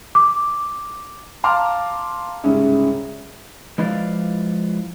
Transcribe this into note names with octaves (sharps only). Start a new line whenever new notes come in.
D6
F5 A5 A#5 C6 D6 F6
C2 G#2 C#3 C#4 E4
F3 G#3 E4 B4 D5 F5